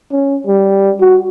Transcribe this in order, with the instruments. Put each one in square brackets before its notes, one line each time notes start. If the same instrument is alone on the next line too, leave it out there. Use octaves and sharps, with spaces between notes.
[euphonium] C#4
G3
F#4